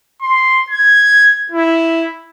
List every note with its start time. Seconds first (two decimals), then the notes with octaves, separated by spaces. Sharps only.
0.22 C6
0.70 G#6
1.52 E4